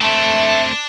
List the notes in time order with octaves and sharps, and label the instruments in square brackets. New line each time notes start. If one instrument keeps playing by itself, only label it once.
[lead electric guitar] A3 C4 [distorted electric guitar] D4 [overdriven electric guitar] E5 A5